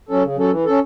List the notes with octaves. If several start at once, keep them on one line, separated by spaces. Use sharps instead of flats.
F#3 C#4 A4
C#3
F#3 C#4 A4
E3
C#4 A4